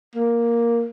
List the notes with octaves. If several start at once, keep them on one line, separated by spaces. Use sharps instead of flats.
A#3